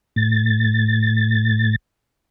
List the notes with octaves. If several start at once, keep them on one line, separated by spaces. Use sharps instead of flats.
A2 A6